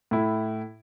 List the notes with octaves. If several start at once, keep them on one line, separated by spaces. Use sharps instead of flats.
A2 E4